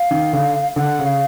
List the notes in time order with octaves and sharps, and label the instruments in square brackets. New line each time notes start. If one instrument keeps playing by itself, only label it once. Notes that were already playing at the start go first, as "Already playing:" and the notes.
Already playing: [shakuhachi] F5
[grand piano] D#3
D3
[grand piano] D3 [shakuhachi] F#5
[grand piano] C#3
[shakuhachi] F5